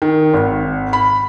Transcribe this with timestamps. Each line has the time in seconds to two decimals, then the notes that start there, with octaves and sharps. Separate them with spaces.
0.02 D#3
0.34 G#1
0.93 B5